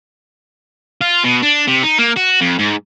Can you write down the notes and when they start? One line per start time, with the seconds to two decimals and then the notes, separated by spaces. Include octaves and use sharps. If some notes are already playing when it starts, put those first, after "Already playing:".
1.01 F4
1.24 B2
1.43 D4
1.68 C3
1.83 D#4
1.98 A#3
2.17 F#4
2.41 F2
2.59 G#2